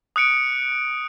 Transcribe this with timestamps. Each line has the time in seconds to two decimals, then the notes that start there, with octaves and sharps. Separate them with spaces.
0.16 D#6 F#6 C#7 D7